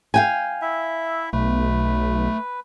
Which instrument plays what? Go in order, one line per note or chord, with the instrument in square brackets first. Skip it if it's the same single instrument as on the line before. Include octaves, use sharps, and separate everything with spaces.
[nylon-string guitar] F5 G5 G#5
[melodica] E4 E5
[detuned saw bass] B1 [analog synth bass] A3 [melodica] B4